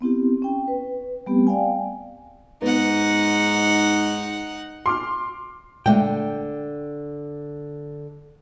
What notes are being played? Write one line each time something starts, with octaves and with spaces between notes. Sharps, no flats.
B3 C4 E4 G4
C#4 G5
B4
G3 A3 B3 C4 G4
D5 F5 G5 G#5
G#2 B3 D#4 F#5
C6 D6 F6
A#2 D3 G#3 A3 G5